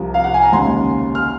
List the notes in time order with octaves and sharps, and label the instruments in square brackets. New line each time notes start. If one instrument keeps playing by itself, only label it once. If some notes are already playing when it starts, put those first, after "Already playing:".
Already playing: [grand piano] C2 C3 F3 A#5
F5
F#5
G#5
A#5
D#2 C#3 G#3 C6
F6